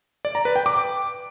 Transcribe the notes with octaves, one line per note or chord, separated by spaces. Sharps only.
D5
A#5
B4
G5
D6